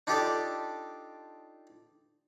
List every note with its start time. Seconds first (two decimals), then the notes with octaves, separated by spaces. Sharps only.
0.07 D4 D#4 F4 G4 A4 D5